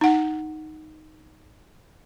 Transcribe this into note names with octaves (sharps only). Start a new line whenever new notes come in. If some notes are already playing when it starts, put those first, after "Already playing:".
D#4 F#5